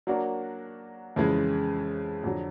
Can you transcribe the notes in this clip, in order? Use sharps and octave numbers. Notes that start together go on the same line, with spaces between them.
F#3 A#3 D4 F#4 A#4
F2 C#3 E3 G#3
F2 D3 F#3